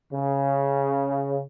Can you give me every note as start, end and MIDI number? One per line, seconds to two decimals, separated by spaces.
0.11 1.41 49